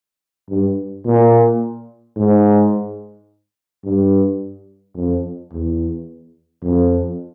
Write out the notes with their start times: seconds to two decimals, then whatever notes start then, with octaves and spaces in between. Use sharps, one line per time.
0.49 G2
1.05 A#2
2.16 G#2
3.84 G2
4.96 F2
5.51 E2
6.63 F2